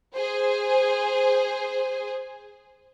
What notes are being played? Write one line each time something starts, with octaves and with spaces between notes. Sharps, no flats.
G#4 C5